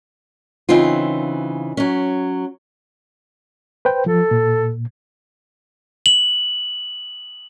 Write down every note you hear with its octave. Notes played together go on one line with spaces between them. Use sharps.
C#3 E3 C4 D#4 F4
F#3 C#4
B4 C5 G5
F3 A4
A#2
F#7